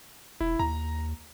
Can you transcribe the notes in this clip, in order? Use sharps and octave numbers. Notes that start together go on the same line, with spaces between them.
E1 E4
D#2 A#5